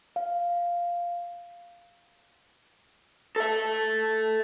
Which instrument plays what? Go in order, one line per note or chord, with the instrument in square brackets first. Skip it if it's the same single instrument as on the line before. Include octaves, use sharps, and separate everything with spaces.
[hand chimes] F5
[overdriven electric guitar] A4 E5